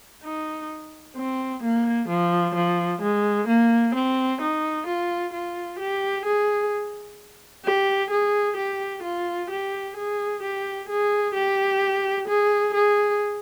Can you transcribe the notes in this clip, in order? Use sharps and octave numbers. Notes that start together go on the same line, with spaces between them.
D#4
C4
A#3
F3
F3
G#3
A#3
C4
D#4
F4
F4
G4
G#4
G4
G#4
G4
F4
G4
G#4
G4
G#4
G4
G#4
G#4